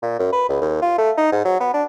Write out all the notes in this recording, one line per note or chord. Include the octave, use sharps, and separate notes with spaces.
A#2
F#2
B4
C#2
D#2
F4
A3
D#4
G#2
F#3
B3
D4